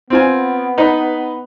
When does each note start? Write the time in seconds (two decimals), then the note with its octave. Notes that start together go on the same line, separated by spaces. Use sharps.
0.10 B3 C4 F4 G#5
0.78 D#4 B4